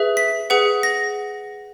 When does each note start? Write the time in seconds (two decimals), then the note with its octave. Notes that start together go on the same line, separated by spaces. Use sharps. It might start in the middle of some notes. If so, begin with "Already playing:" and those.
Already playing: G#4 B4 E5
0.17 B6
0.50 G#4 B4 F#5
0.83 A#6